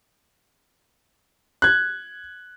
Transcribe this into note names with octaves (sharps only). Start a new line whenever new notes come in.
F#6 G#6